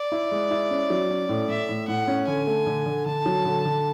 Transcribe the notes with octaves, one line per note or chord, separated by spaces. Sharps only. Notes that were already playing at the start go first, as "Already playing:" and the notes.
Already playing: D5
E4
G#3
E4
C#4
F#3
C#4
A2
A2 E5
A2
A2 F#5
C#4
D3 G#5
A3
D3
D3
D3 A5
F#3
D3
D3